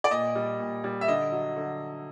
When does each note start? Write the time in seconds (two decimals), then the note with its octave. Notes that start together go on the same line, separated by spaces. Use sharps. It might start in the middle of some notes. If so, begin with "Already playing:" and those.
0.04 D5
0.11 A#2 D#5
0.35 G3
0.59 A#2
0.84 G3
1.01 E5
1.08 D3 D#5
1.32 F#3
1.57 D3